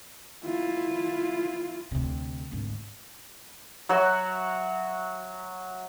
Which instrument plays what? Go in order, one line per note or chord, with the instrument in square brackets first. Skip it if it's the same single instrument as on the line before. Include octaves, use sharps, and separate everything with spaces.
[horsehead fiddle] E4 F4
[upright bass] D2 C3
G#1 D2
[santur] F#3 F#4 E5